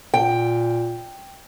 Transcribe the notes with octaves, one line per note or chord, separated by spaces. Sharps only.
A#2 G5